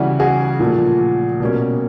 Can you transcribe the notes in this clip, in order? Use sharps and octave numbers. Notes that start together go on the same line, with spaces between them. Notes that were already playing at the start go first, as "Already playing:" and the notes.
Already playing: C#3 E3 G3 E4 F#4
F#4 G#4
A#2 F3 A3
B2 G3 A#3 C#4